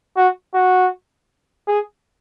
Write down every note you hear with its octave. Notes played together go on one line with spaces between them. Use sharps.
F#4
F#4
G#4